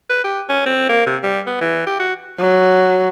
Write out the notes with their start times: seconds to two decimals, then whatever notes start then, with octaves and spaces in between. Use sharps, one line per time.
0.09 B4
0.24 G4
0.49 C#4
0.66 C4
0.89 A#3
1.07 C3
1.23 G3
1.46 B3
1.61 E3
1.87 G4
2.00 F#4
2.39 F#3